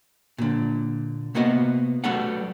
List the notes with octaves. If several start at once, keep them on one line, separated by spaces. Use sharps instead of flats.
A#2 D3
C3 A#3 B3 F#4 D#5
F#3 G3 A3 A4 B4 F#5